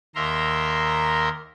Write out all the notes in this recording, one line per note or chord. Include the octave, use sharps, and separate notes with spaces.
D#2 A#4 E5 A#5 C6